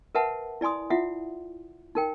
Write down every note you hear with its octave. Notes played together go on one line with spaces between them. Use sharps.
A#4 B4 E5 F#5 A5
E4 D5 G#5 C6 D#6
E4 F4 E5 F#5
D#4 A#4 G5